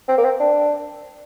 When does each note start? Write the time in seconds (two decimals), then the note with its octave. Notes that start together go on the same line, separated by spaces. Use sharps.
0.08 C4
0.18 A#3
0.24 C4
0.40 D4